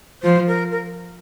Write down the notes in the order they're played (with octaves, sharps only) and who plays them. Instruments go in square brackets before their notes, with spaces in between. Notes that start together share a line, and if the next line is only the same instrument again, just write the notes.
[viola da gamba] F3 [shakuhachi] C5
[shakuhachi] A#4
A#4